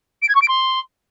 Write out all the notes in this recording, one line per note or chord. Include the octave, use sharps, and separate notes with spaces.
D7
G#6
C#6
D7
C6